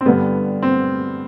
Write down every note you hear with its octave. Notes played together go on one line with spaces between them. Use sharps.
C4
G2 D3 G3 B3
C4